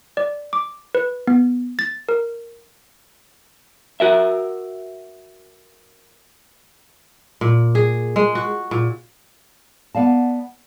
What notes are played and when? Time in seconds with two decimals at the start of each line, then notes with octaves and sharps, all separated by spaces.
0.17 D5
0.53 D6
0.95 B4
1.27 B3
1.79 A6
2.09 A#4
4.00 F#4 A#4 E5
7.41 A#2
7.75 G#4
8.16 G#3
8.35 F#4
8.71 A#2
9.95 B3 D5 F5 A5